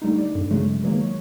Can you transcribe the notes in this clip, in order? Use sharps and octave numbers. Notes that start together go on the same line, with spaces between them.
D3 G3 A3 D#4
D5
G2 D3
C#3 F#3 G#3 A3
D#3 E3 F#3 G#3 A#3
C#5